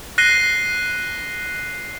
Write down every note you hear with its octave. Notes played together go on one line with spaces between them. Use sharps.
F#6 A#6 C7 D#7 G7